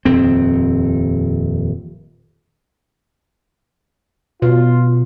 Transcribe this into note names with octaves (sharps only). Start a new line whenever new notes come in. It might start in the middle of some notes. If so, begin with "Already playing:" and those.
D#1 F2 C4
B2 F4